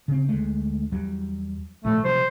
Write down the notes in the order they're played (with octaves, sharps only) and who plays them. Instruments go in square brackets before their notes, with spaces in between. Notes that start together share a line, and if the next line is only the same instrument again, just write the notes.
[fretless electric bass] C#3 C4
D2 G#3 A3
E2 F#3 G3
[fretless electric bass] G#1 A#2 F3 [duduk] A3
[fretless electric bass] C3 F3 F#3 [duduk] C5